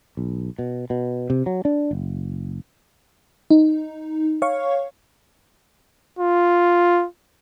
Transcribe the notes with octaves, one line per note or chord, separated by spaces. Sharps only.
B1
B2
B2
C3
F#3
D4
F#1
D#4
C#5 F5 C#6
F4